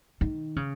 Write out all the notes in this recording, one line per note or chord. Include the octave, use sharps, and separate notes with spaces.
D#3
C#3